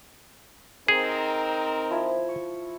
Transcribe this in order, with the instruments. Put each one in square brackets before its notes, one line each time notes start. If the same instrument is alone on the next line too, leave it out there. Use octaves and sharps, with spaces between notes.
[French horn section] C4 D#4 A#4 [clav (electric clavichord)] G#4
[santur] F3 E4
C#6